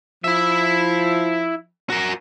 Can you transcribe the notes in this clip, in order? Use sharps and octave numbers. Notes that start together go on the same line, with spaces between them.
F3 E4 E5
F#4 A#4